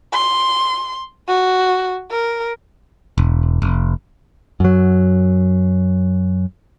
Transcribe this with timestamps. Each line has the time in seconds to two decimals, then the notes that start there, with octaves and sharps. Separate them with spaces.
0.13 C6
1.28 F#4
2.11 A#4
3.18 E1
3.62 F1
4.60 F#2 F#3